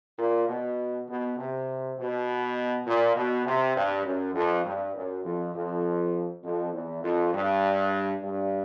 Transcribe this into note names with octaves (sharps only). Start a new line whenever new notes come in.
A#2
B2
B2
C3
B2
A#2
B2
C3
G2
F#2
F2
G2
F#2
F2
F2
F2
E2
F2
G2
G2